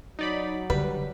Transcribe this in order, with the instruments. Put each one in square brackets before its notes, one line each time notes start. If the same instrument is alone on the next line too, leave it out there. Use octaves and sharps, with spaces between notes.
[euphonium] F#3 [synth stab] D#4 D5 B5
[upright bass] D3 [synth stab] G3 [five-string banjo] B4